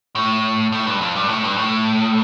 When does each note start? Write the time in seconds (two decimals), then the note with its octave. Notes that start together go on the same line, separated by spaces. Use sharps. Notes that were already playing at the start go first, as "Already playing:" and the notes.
0.15 A2
0.72 A2
0.87 G2
1.01 F2
1.15 G2
1.29 A2
1.44 G2
1.58 A2